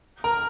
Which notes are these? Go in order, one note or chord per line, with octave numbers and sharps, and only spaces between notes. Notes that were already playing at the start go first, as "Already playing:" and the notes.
A#4 A#5